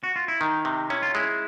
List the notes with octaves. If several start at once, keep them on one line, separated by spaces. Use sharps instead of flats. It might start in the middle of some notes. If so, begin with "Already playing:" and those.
F#4
F4
E4
D#3 D#4
C3
C#4 E4
F4
G#3 E4